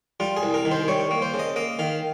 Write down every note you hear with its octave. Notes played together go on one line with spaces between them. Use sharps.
G3 F4
G#4
C2
A#4
D#3
C5
G3 C#5
A#3
C5
C#3
D#5
A#3 D#5
D#3 F5